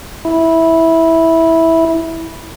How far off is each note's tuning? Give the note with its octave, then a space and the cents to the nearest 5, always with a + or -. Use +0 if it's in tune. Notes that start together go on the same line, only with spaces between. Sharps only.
E4 -10